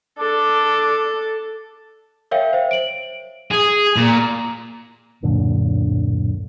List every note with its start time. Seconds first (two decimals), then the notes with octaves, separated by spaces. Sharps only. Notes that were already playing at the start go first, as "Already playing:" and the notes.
0.19 D4 A4
2.31 A#4 C#5 E5 F5 G5
2.53 C5 E5
2.71 D7 F#7
3.51 G#4
3.96 A#2
5.23 D1 F#2 A#2 D3